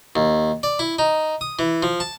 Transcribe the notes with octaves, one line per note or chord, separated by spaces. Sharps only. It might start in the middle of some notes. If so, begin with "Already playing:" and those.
D#2
D5
E4
D#4
D#6
E3
F3
A5